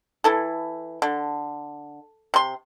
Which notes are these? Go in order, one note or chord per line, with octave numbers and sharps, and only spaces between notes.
E3 E4 A4
D3
C3 C6